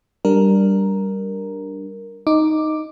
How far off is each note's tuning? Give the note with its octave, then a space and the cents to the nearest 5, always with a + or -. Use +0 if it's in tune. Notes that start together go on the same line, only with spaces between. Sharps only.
G3 -5 D4 +0 A#4 +0
D#4 +0 D6 +5